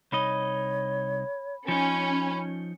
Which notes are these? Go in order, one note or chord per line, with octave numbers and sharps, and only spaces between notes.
C2 D#4 C#5 D#5 B5
F3 C#4 D#4 B5 C#7